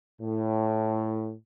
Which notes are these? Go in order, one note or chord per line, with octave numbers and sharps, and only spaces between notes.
A2